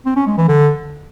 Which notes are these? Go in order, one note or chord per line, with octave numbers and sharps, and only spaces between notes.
C4
C#4
G#3
E3
D3